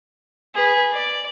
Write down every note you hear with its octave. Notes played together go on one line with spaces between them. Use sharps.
G#4 B4
D5